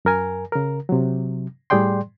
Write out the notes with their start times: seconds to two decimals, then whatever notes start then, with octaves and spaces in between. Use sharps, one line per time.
0.05 F#2 A#4 G#5
0.52 C#3 A#4
0.89 C3 F#3
1.70 A2 G3 G#4 D5 G5 C6